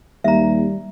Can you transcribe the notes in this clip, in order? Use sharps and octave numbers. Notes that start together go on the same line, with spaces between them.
D#2 G3 E5 A#5